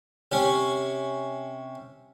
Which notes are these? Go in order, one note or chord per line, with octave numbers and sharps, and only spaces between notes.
C3 C#4